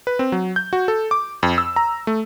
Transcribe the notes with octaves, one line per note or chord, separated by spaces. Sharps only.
B4
C4
F#3
G6
F#4
A4
D6
F2
E6
A#5
A3